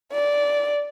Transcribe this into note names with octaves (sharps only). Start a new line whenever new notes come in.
D5